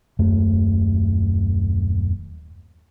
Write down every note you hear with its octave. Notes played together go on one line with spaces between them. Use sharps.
D#1 F#2 A3